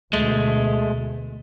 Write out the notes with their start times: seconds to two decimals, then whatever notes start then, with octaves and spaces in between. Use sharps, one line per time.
0.13 D2 B2 G#3 A3